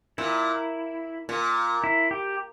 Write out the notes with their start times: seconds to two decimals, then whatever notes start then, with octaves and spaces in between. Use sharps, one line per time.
0.18 A#2 E4
1.29 A#2
1.84 E4
2.11 G4